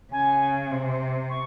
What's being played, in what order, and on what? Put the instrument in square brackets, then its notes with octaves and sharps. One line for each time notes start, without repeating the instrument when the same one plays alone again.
[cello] C#3 [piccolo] G#5
[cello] C3
[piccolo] C#6